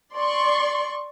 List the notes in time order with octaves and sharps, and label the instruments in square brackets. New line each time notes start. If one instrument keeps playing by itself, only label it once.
[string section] D5 C6 C#6